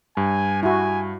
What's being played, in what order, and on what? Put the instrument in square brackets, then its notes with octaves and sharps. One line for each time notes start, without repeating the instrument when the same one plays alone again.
[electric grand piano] G2 [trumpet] G#5
[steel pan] E4 F#4 [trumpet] G#5